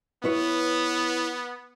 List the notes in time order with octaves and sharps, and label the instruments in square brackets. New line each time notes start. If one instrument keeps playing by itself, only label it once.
[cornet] B3 [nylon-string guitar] E4 B4 C#5